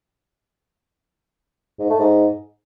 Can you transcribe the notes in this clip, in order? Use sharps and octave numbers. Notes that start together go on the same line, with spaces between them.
G#2
A3
G#2